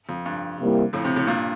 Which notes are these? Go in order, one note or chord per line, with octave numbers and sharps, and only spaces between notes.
F2
G2
C3 G3 A#3 E4
F2 A2
A2 C3
A2 C3
G2 A#2